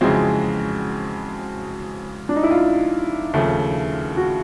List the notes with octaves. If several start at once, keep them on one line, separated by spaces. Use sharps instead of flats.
F2 C#3 E3 G#3 C4 F#4
D4
D#4
E4
F4
D#2 C#3 F3 A3
F#4